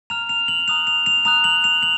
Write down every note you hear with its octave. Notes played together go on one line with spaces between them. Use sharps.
A#5 F6 F7
F7
F#7
A#5 D#6 F#6 F7
F7
F7
A#5 D#6 F#6 F7
F#7
F7
F#7